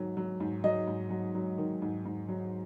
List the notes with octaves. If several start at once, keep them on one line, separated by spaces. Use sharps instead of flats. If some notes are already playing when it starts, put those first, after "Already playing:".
Already playing: G#2 D#3 F#3
F#3
G#2
F#3 D#5
G#2
F#3
F#3
D#3
G#2
G#2
F#3